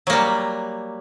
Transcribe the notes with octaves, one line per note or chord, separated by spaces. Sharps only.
F#3 G3 A#3